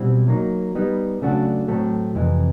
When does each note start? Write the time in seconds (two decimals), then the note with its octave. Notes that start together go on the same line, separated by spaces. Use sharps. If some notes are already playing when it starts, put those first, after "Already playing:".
Already playing: B2 G3 C4 E4
0.28 F#3 A#3 D#4
0.75 G3 B3 D#4
1.22 C#3 F#3 A3 D4 F#4
1.68 A2 F#3 A3 C4
2.15 F2 C3 E3